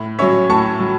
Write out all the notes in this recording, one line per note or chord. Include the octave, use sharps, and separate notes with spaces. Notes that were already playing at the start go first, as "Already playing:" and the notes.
Already playing: A2
F#3 C#4 C#5 E5
A2 A5 C#6
F#3